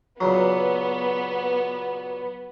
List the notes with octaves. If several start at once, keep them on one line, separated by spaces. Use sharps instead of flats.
A#2 C#3 F#3 B3